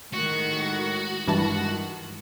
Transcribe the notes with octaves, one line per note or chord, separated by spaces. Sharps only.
A2 D#3 G#3 F#4
G2 D#3 E3 G#3 A5